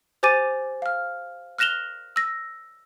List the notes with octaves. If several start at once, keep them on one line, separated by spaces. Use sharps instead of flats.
G4 C5 G#5 D6 A6 D#7
F5 F6
F6 F#6 A#6 E7 F7 G7
E6 A#6